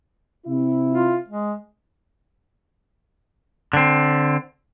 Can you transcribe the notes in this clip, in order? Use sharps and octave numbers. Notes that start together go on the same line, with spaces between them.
C3 E4
F4
G#3
D3 C4